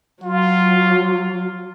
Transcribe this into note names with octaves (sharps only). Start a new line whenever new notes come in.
F#3 F4